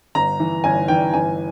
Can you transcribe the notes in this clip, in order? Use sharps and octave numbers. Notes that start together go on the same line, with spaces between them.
G1 A#5
E3
G1 G#5
E3 G5
G1 G#5